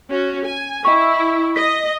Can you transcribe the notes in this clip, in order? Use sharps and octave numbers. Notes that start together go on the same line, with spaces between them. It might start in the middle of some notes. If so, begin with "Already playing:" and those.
C#4 F#4
G#5
E4 D#5 G5 C#6
D#5 B6